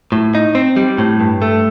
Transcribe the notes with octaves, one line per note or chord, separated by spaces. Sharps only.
A2
D#4
C4
G3
A2
G2
A3